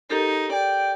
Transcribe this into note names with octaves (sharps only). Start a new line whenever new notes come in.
D#4 G4 A4 A#4
D5 G5